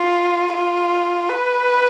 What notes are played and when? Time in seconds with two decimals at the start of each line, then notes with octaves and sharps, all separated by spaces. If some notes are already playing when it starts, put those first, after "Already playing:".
Already playing: F4
0.54 F4
1.29 B4